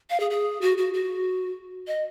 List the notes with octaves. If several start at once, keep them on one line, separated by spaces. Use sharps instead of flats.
F5
G#4
G#4
F#4
F#4
F#4
D#5